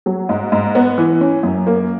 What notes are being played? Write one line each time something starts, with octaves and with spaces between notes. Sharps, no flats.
F#3
G#2
G#2
B3
E3
C#4
F#2
A#3